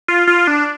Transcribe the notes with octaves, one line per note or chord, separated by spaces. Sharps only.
F4
F4
D4